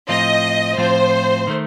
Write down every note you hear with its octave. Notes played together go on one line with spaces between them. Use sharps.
A2 F3 C4 F4 D#5
A2 F3 C4 F4 C5
D#3 A3